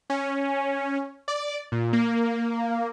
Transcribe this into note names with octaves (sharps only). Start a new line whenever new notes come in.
C#4
D5
A#2
A#3